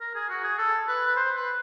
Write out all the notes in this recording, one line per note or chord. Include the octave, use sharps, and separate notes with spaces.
A#4
G#4
F#4
G#4
A4
B4
B4
C5
B4